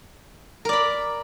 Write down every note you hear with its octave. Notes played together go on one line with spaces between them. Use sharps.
A#4 D5 B5